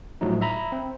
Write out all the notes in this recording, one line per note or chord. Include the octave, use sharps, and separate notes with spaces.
A2 F3 F#3 A3 D#4
E5 A#5 B5
C4